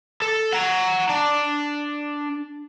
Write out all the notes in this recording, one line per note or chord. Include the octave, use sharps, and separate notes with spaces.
A4
F#5 A#5
D4